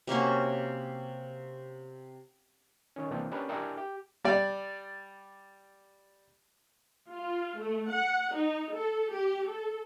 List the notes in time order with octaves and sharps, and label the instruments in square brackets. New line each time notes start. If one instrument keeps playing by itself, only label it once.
[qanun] C3 A#3 C#4 F#4
[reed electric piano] D#3 C#4
C2 E3 A#3 C4 D4 G5
C#4 D4 G4 A#4 B4
D4 E4 G4 A#4 E5 G#5
G4
[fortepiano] G3 D5
[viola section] F4
A3
F#5
D#4
A4
G4
A4